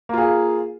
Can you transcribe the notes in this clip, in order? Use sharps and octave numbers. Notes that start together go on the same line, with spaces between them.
A#3 F4 G#4